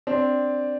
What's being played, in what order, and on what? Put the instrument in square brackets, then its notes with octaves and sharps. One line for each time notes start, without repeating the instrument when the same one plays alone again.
[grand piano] C4 D4